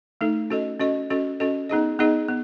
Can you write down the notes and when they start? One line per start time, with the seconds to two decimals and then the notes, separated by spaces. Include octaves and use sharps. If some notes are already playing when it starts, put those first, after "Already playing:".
0.21 A3 D#4 A4
0.50 C#4 F#4 A4 D#5
0.79 C#4 F#4 A4 D#5
1.10 C#4 F#4 A4 D#5
1.40 C#4 F#4 A4 D#5
1.69 B3 D#4 G#4 D#5
1.99 B3 D#4 G#4 D#5
2.28 B3